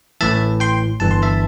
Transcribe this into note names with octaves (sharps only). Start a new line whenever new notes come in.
A1 A2 E3 E5 A5
G5 C6
G1 G2 E3 A5
C6
E5 A5